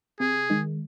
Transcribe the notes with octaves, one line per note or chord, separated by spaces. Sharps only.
C3 G#4
D#3 G#3